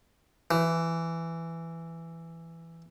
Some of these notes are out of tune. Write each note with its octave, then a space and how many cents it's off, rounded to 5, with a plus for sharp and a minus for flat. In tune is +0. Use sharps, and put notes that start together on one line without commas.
E3 +10